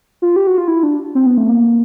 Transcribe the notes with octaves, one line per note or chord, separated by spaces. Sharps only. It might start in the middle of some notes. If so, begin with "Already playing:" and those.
F4
G4
F#4
F4
E4
D4
C4
B3
A3
A#3